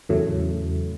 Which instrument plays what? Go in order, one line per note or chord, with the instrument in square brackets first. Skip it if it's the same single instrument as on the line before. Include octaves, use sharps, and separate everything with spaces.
[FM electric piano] E2 A2 C#3 F#3 A3